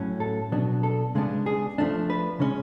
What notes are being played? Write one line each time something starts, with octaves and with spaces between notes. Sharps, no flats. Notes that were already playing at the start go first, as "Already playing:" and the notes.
Already playing: A2 F#3 C#4
A4
B2 F#3 B3 D4
A4
C#3 G#3 B3 D4
G#4
F3 A3 D4
B4
C#3 G#3 C#4